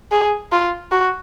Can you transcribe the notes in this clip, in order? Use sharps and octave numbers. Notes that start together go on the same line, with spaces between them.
G#4
F4
F#4